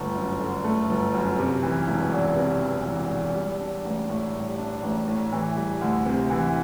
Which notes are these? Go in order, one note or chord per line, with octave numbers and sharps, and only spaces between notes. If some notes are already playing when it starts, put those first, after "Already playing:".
Already playing: G1 D3 A3
F#2
D3
A3
G1
F#2
C3
E3
E1
E2
C3
E3
E1
E2
G3
D4
A1
A2
G3
D4
A1
A2
E3
G3
D2
C3
E3